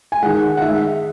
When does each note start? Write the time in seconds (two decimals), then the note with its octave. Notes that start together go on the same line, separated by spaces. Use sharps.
0.12 G#5
0.22 D#3 G#3 F#5
0.57 F#5
0.61 D#3 E5
0.67 G#3